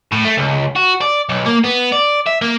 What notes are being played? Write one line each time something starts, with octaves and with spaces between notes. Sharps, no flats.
A2
A3
C#2
F#4
D5
B1
A#3
B3
D5
E5
A#3